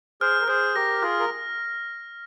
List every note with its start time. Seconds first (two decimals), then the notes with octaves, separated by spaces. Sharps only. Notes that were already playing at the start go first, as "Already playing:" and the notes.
0.21 G#4 C5 F6
0.41 A#4
0.48 G#4 C5 F6
0.75 G4 A#4 A#6
1.02 F4 G#4 F6
1.20 A#4